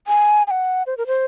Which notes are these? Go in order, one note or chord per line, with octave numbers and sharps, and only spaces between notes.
G#5
G#5
F#5
C5
A#4
C5